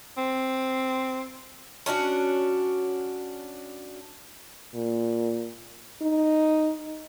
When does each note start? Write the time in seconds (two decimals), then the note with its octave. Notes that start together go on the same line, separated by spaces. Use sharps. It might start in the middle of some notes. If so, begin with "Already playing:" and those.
0.17 C4
1.86 C#4 D4 E4 F#4
4.74 A#2
6.02 D#4